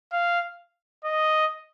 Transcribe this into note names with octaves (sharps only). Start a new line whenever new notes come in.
F5
D#5